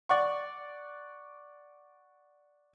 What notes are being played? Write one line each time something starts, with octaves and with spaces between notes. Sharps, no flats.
D5 F#5 C#6